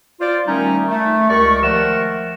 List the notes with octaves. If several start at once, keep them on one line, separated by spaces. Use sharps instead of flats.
F4 C5 D5
D#3 G3 A3 C#4 D#4
A3
C#2 G4 A#4 D5 C#6
D#3 F3 A3 A#4 F#5 E6